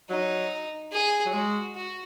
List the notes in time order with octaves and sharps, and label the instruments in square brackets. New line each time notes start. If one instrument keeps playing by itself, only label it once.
[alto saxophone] F#3 [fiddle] D#4
[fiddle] G#4
[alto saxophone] F#3
[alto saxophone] G#3 [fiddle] F#4
[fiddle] F#4